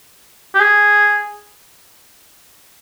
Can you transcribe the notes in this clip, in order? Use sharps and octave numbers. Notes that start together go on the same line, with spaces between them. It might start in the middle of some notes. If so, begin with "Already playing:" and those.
G4
G#4